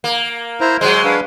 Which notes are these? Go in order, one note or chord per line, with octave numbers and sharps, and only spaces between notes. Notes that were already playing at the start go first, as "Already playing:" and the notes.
A#3
E4 C5 A#5
F#3 G#3 C5 C6
D4 B4 F5